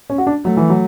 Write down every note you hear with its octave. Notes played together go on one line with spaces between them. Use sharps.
C#4
F#4
D4
F#3 A3
E3
F#3